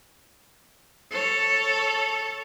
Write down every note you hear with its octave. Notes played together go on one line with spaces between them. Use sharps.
A4 C#5